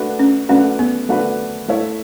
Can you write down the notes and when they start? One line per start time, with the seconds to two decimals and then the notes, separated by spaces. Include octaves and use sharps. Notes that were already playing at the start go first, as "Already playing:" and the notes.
Already playing: A3 D4 F#4 B4
0.19 C#4
0.49 A3 C#4 D4 F#4 B4
0.79 B3
1.09 A3 D4 F#4 B4
1.68 A3 E4 A4 C#5 E5